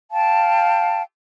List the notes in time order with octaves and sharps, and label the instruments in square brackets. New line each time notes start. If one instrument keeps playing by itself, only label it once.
[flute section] F5 G5 A5